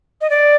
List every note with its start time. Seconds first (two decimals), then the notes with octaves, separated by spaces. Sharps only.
0.21 D#5
0.30 D5